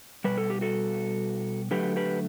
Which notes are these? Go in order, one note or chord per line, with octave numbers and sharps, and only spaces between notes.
B2 G3 B4
A4
G4
F#4 A4
D3 F#3 A3 G4 B4
G4 B4